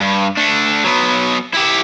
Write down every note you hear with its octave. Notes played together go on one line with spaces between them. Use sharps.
G2
A3 D4
F#3 B3
E4 G4